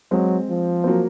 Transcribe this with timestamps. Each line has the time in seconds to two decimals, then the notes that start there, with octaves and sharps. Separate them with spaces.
0.11 F#3 G#3 C4
0.50 F3
0.84 C4
0.87 F#3 A#3